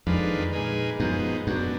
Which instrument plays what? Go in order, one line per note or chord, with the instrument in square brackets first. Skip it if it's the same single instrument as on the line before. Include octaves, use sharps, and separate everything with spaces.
[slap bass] F2 [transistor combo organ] D#3 G#3 D4 F4 B4
[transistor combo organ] A#2 G#3 D#4 G#4 B4
[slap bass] F#2 [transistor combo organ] F3 G#3 B3 D#4
[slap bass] F#2 [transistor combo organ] F#3 B3 D4